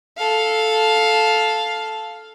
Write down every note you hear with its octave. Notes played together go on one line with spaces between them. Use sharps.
A4 F5